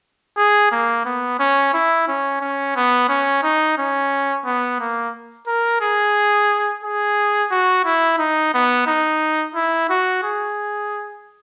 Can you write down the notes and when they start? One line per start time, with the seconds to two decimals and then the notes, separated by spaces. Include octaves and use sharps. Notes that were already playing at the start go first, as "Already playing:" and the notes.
0.37 G#4
0.72 A#3
1.05 B3
1.39 C#4
1.73 E4
2.08 C#4
2.41 C#4
2.76 B3
3.09 C#4
3.43 D#4
3.78 C#4
4.45 B3
4.80 A#3
5.47 A#4
5.81 G#4
6.84 G#4
7.51 F#4
7.85 E4
8.19 D#4
8.54 B3
8.87 D#4
9.55 E4
9.89 F#4
10.24 G#4